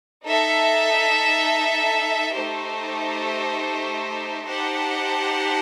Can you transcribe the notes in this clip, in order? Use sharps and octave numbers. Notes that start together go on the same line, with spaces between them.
D#4 A4 E5
A3 D#4 G4 C5
D#4 G4 C5 F#5 A5